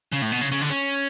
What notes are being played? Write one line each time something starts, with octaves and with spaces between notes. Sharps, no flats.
C#3
A2
B2
C#3
C#3
D3
C#4